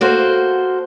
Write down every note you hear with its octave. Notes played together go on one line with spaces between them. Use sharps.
A#3 F#4 A4 C5